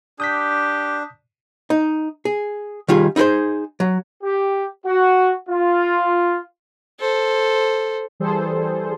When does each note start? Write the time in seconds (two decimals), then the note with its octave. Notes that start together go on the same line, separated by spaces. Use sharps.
0.20 D4 G4 D#6 G6 B6
1.70 D#4
2.25 G#4
2.88 D#3 G3 F4 G#4
3.16 D#4 E4 G4 G#4 C5
3.80 F#3
4.23 G4
4.86 F#4
5.49 F4
7.00 A4 C5
8.20 E3 G3 G#4 A4 C5